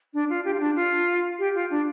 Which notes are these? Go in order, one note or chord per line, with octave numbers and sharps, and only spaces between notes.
D4
F4
G4
F4
D4
F4
G4
F4
D4